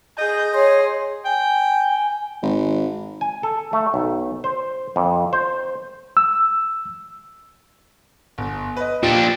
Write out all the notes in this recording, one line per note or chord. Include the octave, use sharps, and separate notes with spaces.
G#4 D#5 G6
G#4 C#5 C6
G5 G#5
G#1
G#5
A4
A3
B1
C5
F2
C5
E6
G1
B4 D#5
A#2 D4 F4 G4